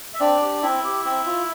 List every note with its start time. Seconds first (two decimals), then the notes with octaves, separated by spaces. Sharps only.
0.14 E5
0.20 C4 D4 D5
0.42 G4
0.62 C4 E4 E5
0.84 G4
1.05 C4
1.26 F4